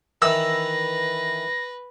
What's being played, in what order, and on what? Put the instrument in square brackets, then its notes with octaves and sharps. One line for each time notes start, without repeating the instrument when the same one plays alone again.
[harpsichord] D#3 E3 [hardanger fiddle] B4 [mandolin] E6 [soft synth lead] A#6